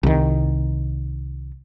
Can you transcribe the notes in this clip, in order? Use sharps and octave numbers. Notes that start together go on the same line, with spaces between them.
C2 D#3